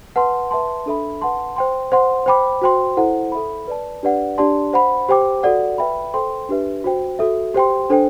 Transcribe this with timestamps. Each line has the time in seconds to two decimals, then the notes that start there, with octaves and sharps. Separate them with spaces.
0.16 B4 F#5 A5 C6
0.51 B4 E5 A5 C6
0.86 D4 A4 E5 B5
1.21 B4 F#5 A5 C6
1.56 C5 G5 C6
1.92 C5 F#5 C6
2.26 C5 G5 B5 D6
2.62 F#4 C5 G5 C6
2.97 E4 A4 C5 F#5
3.32 A4 E5 B5
3.67 B4 D5 A5
4.03 D4 G4 B4 D5 F#5
4.38 D4 G4 D5 A5 C6
4.73 C5 F#5 B5
5.09 G4 C5 G5 D6
5.43 F#4 A4 D5 F#5
5.78 B4 E5 G5 B5
6.14 A4 C5 G5 C6
6.49 D4 G4 B4 E5
6.84 F#4 C5 G5
7.19 F#4 A4 E5
7.55 G4 C5 G5 C6
7.90 D4 A4 C5 G5